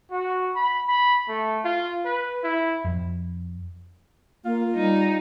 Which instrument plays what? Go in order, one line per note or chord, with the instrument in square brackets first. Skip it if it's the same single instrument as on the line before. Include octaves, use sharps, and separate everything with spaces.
[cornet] F#4
B5
B5
A3
F4
B4
E4
[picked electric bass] F2
[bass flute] A#3 [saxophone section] F4
[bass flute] G3 [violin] D#4